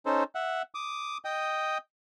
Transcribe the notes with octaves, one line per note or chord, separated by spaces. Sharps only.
C#4 D#4 A4 C5
E5 F#5
D6 D#6
D#5 G5 D#6